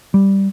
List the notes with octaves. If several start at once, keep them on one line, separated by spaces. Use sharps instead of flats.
G3